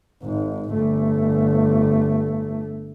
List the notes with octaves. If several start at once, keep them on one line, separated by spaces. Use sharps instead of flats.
G#1 G#2
G1 A3